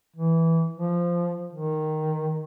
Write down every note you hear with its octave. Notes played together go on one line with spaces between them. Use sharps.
E3
F3
D#3